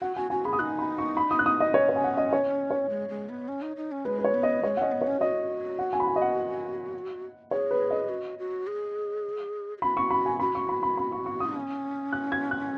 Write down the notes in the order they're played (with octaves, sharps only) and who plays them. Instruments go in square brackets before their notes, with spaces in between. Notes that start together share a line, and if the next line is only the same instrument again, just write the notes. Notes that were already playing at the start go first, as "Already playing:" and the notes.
[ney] F#4 [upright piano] F#5
[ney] F#4 [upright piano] G#5
[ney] F#4 [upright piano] G#5
[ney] G#4 [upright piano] B5
[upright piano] D#6
[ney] D#4 [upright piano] F#6
[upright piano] B5
C#6
B5
D#6
F#6
D#6
D#5
[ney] C#4 [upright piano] C#5
[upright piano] C#5
G#5
F#5
D#5
C#5
C#5
[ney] G#3
G#3
B3
C#4
D#4
D#4
C#4
[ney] G#3 [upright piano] B4
[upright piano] B4
C#5
[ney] B3
[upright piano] D#5
[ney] G#3 [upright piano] C#5
[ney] C#4 [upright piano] D#5 F#5
[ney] B3
[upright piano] C#5
[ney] C#4
[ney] F#4 [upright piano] D#5
[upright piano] F#5
G#5
B5
G#5
D#5
F#5
[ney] G#4 [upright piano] C#5
[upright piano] B4
D#5
[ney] F#4
F#4
G#4
G#4
[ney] F#4 [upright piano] B5
[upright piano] C#6
B5
G#5
[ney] F#4 [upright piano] B5
[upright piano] C#6
B5
B5
B5
C#6
C#6
D#6
[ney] C#4
[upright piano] F#6
G#6
F#6